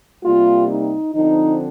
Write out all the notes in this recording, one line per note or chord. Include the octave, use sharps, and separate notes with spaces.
C3 G3 A#3 F4
D#4
D3 F3 C4 D#4